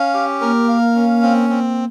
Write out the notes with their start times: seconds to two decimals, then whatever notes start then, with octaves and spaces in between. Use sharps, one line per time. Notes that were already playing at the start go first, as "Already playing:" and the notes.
Already playing: C#4 F5
0.14 G4
0.41 A#3 A#4
0.69 F5
0.95 C#4
1.22 C4
1.50 C4